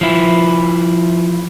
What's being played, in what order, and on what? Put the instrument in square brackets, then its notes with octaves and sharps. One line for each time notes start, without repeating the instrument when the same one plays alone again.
[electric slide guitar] F3 E4